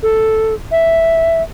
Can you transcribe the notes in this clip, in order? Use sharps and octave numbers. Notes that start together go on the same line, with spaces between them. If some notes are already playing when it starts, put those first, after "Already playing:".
A4
E5